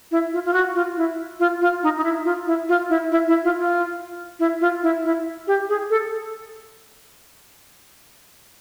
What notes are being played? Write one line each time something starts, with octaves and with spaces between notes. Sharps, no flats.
E4
F4
F4
F#4
F4
E4
F4
F4
D#4
D#4
E4
F4
E4
F4
E4
E4
E4
F4
F4
E4
F4
E4
E4
G4
G#4
A4